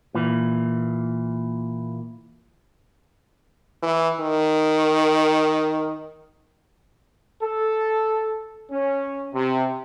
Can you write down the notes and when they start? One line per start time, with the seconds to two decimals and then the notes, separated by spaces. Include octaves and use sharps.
0.15 A#2 E3
3.82 E3
4.20 D#3
7.42 A4
8.71 C#4
9.34 C3